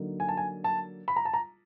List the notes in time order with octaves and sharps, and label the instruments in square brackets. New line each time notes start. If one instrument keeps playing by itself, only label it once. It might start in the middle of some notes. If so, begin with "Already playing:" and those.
Already playing: [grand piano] D3 F#3 A#3 D#4
G#5
A5
G#5
A5
B5
A#5
A5
A#5